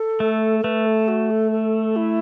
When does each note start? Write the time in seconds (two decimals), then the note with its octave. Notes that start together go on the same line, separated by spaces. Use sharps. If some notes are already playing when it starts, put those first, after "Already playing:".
Already playing: A4
0.20 A3
0.59 A4
0.64 A3 B4
0.86 A4
1.08 F#4
1.31 A4
1.52 A4
1.96 E4